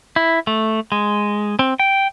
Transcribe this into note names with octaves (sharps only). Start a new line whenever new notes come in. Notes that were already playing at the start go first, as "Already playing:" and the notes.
E4
A3
G#3
C4
G5